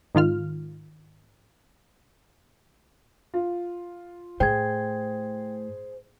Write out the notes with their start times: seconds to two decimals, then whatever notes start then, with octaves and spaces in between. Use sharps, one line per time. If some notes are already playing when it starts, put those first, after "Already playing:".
0.15 G#2 D#3 F4 F6
3.34 F4
4.40 A2 G#4 C5 G5 G#6